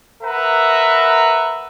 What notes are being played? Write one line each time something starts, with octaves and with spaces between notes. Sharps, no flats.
A#4 B4 E5 F#5 A#5